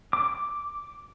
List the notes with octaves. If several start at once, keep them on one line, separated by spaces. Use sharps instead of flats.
D6